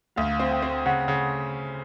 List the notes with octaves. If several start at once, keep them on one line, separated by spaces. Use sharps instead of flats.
D2 F5
C4
G5
C4
C#3 F#5
C#3